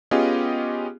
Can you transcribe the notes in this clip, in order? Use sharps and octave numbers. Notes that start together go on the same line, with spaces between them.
B3 C#4 F4 G4 G#4 D#5